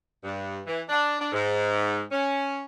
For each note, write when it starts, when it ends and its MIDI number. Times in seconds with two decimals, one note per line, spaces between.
0.24 0.61 43
0.66 0.82 52
0.89 1.17 62
1.20 1.32 62
1.33 2.02 44
2.11 2.65 61